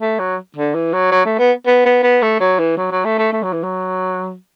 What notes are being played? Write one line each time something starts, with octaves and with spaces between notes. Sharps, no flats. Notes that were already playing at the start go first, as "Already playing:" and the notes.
A3
F#3
D3
E3
F#3
F#3
A3
B3
B3
B3
B3
A3
F#3
E3
F#3
F#3
A3
A3
A3
F#3
E3
F#3